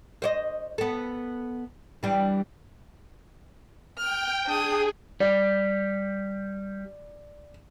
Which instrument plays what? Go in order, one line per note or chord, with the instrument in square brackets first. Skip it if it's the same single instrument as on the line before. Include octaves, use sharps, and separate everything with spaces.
[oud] C5 C#5 D#5
B3 A4
E3 G3 D4
[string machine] G5 [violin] F6
[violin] D4 D#6 [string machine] G#4
[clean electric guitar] G3 [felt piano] D5